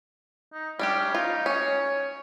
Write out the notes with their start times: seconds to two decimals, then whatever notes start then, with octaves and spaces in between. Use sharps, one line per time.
0.53 D#4
0.79 G3 C#4 D4 G4
1.15 D#4 F4
1.46 C#4 C#5